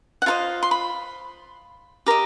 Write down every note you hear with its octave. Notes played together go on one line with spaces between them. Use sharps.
F#5
F4 A4 C5 D#5 F5
C6
B5
G4 A#4 D#5